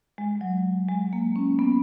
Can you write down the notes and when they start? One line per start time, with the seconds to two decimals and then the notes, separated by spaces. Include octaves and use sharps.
0.18 G#3
0.41 F#3
0.89 G#3
1.13 A#3
1.36 C#4
1.59 B3